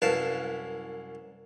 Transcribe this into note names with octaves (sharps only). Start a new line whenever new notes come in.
C2 F#2 E4 B4 F5 A5